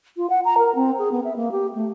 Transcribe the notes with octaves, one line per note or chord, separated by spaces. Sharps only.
F4
F#5
A#5
A#4
C4
G#4
B3
E5
A#3
G4
A3